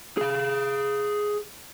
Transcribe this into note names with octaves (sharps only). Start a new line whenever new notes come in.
G#4 F5